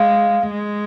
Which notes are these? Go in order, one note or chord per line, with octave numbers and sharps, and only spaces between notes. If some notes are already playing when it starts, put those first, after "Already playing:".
Already playing: G#3 F5
G#3